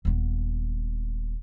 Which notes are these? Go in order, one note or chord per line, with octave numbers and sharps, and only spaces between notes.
D#1 B3